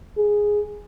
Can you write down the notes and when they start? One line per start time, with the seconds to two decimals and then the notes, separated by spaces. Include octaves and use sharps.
0.17 G#4